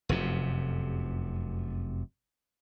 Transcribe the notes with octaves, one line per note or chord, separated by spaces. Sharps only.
F1 F#2 C3